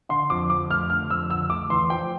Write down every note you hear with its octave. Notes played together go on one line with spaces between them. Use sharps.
D3 C6
F2 D6
F2 D6
A3 F6
D3 F6
F2 E6
D3 E6
A3 D6
E2 C6
F3 G5